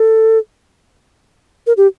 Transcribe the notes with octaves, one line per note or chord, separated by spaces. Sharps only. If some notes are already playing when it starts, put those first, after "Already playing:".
Already playing: A4
A#4
G4